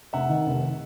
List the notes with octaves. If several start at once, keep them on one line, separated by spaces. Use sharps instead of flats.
F1 E5 F#5
D#3
F1